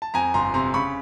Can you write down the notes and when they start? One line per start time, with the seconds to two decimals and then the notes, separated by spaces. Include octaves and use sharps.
0.02 A5
0.14 F2 G#5 A#5
0.34 G1 A#5 C6
0.54 C3 A#5 C6
0.74 C#3 B5 C#6